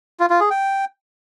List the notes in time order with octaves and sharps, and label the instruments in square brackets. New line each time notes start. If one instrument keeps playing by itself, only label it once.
[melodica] F4
F4
G#4
G5